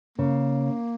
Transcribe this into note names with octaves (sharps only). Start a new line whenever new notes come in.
C#3 A#3